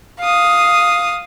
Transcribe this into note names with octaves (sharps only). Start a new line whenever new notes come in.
F5 D#6